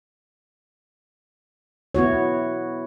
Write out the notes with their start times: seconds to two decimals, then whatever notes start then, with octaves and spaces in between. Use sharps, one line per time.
1.95 B3 E4 F#4 C#5